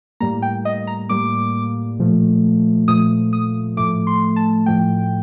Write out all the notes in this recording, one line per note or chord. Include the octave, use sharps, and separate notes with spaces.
A2 G3 A#3 A#5
G5
D#5
A#5
A2 G3 A#3 D6
A#2 F3 A3
A#2 F3 A3 D#6
D#6
A2 F3 A3 D6
C6
A5
A2 F3 A3 G5